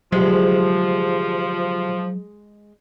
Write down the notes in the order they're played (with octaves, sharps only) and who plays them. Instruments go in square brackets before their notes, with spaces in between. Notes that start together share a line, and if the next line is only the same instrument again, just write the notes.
[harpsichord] D2 C3 [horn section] F3 [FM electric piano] F#3 [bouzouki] G#3